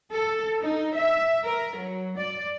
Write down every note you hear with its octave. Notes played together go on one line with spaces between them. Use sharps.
A4
D#4
E5
A#4
F#3
D5